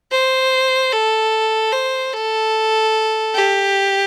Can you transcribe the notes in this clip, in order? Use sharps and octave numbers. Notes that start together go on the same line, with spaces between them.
C5
A4
C5
A4
G4